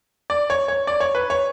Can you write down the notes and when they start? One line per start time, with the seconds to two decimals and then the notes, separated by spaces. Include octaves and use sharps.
0.30 D5
0.50 C#5
0.68 C#5
0.87 D5
1.00 C#5
1.15 B4
1.30 C#5